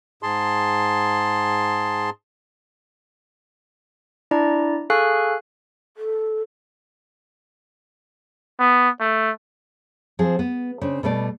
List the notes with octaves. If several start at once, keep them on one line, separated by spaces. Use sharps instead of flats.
G#2 G#4 A5 C6
D4 E4 D5 A#5
G#4 A4 F5 G#5 C#6 F#6
A4
B3
A3
F3 C4 G#4
B3
C#3 C4 D4
B2 G3 A3 C#5 D5